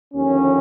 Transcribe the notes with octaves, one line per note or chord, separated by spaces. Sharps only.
D#2 D3 F3 C#4